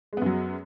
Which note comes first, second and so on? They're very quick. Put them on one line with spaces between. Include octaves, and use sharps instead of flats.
G#3 B3 F#2 F#3